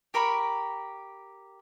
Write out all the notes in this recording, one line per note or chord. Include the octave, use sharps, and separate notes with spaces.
G4 A#4 B5 C#6